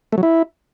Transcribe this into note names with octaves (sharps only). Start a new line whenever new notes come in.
A3
F#3
E4